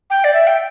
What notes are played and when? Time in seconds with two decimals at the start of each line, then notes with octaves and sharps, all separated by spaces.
0.10 G5
0.24 D5
0.33 E5
0.47 G5